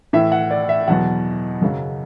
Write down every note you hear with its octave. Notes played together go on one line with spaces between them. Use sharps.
A2 E3 E5
F#5
D5
E5
E2 B2 F#3 F#5
F#2 C#3 F#3